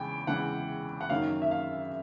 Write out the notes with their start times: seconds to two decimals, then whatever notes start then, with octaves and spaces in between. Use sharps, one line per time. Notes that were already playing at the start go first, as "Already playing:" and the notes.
Already playing: E2 C#3 E3 G#3 G5 G#5
0.27 E2 C#3 E3 G#3 F#5
1.01 F#5
1.10 F#2 D#3 F#3 A#3 F5
1.42 E5
1.51 F5